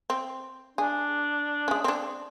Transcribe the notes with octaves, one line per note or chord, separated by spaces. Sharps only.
C4
D4 G#4
G#3 C#4
C4 D4